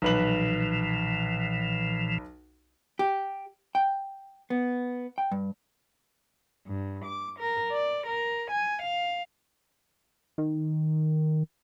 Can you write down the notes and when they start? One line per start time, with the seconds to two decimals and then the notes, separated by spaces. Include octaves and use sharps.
0.02 B1 A#2 E3 F3 B4 F#7
2.99 G4
3.75 G5
4.50 B3
5.18 G5
5.32 G2
6.66 G2
7.04 D6
7.38 A#4
7.72 D5
8.06 A#4
8.50 G#5
8.81 F5
10.38 D#3